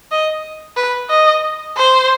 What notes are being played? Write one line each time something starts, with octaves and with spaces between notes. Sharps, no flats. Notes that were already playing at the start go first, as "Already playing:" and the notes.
D#5
B4
D#5
C5